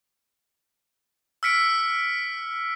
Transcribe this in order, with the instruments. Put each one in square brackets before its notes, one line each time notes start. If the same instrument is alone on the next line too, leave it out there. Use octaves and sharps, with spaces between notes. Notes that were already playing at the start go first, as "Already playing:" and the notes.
[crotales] E6 F6 B6 C#7 D7